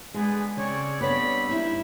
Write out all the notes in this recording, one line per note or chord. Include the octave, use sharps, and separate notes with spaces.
G#3 B3 D4 G#4
C#3 C4 C#5 D5
G2 B3 C4 C#5 D5 B5
D#4 E4